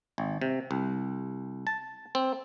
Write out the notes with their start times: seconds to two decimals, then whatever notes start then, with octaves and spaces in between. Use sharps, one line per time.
0.18 G#1
0.41 C3
0.71 C2
1.67 A5
2.15 C4